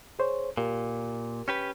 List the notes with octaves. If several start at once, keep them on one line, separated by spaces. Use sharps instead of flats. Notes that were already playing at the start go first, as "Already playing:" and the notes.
G#4 C5 C#5
A#2 G4 A#4
C#4 G4 B4